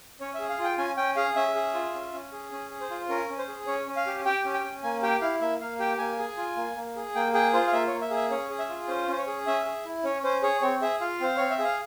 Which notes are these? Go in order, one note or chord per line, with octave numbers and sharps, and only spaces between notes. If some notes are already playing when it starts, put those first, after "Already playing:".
C#4 C#5
G#4 E5
F5
F4
G5
C#4 G#5
C#4 G5
G#4 F5
C#4 E5
G#4
F4
C#4
C#4
G#4
C#4
G#4
C5
F4
C#4 A#4
C#4
C5
G#4
C#4 C#5
C#4
F5
G4
G4 G5
C#4
G5
C#4
A#3 G#5
G4 G5
E4 F5
A#3 E5
A#3 F5
G4 G5
A#3 G#5
G#4
F4
A#3
A#3
G#4
A#3 G5
G#4 G5
F4 C5
F5
A#3 E5
A#3 C#5
E5
G#4
E5
C#4 C#5
G#4
E5
F4
C#4 C5
C#4 C5
C#5
G#4
C#4 E5
G#4
E4
C#4 C#5
C#4 C5
G#4 C#5
C4 C#5
G#4 E5
F4 F5
C4 C5
C4 C#5
E5
G#4
F5